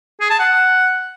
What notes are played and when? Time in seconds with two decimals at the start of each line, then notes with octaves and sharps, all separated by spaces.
0.21 G#4
0.30 A5
0.40 F#5